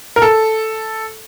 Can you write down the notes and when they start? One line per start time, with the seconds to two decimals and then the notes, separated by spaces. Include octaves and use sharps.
0.16 A#4
0.22 A4